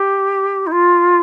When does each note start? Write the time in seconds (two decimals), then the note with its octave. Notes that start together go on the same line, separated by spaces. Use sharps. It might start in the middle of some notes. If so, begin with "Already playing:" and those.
Already playing: G4
0.67 D#4
0.72 F4